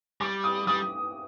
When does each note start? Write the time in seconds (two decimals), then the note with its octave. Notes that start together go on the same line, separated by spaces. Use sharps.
0.21 G3 D6
0.44 D#6
0.67 G3 D#6